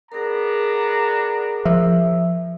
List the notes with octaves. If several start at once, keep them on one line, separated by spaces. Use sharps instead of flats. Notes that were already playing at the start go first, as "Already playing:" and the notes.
B3 D4 G#4 A#4 A#5
F3 E5